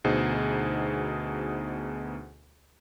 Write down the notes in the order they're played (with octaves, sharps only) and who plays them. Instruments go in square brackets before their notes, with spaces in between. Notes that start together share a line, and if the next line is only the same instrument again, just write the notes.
[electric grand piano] D2 B2 D#4 G#4 C5